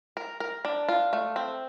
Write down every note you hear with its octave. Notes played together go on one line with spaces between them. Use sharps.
A#4
A#4
D4
F4
A3
C4